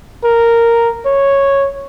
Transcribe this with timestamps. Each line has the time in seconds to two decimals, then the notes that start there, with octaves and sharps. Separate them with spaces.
0.24 A#4
1.06 C#5